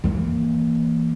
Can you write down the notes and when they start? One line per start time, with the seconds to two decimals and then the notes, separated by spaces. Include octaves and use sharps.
0.04 E3 A#3